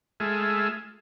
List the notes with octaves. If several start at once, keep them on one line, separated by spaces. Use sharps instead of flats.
G#3 A3 F4 G#4 E5